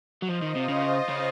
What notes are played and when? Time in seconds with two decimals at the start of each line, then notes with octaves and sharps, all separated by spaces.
0.22 F#3
0.29 F3 F4 C5 D#5
0.42 D#3
0.55 C3
0.69 C#3
1.09 C#3